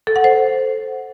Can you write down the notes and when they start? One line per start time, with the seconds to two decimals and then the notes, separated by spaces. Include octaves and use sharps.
0.07 A4
0.16 F#5
0.24 C5